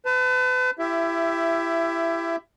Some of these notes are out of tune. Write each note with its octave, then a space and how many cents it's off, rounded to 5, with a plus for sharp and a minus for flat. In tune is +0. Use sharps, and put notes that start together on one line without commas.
B4 +40 A5 +15
E4 +25 G4 +5 E5 +15